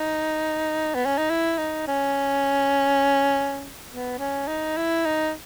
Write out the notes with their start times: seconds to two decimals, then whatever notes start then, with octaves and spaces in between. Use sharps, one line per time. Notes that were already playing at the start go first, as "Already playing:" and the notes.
Already playing: D#4
0.94 B3
1.05 C#4
1.18 D#4
1.30 E4
1.58 D#4
1.87 C#4
3.90 B3
4.19 C#4
4.47 D#4
4.77 E4
5.05 D#4